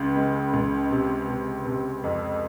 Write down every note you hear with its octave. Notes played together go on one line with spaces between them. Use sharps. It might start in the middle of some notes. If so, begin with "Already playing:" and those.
Already playing: C#2 C#3
G#3
C#2
C3
C3
C3
F2